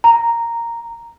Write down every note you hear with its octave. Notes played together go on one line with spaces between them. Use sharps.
A#5